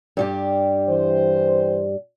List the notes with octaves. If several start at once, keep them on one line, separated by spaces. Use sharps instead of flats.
G2 G3 G4
E3 C5